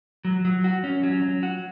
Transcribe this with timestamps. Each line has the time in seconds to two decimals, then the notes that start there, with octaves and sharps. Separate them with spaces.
0.25 F#3
0.45 F#3
0.64 F#4
0.84 C#4
1.03 F#3
1.22 F#3
1.43 F#4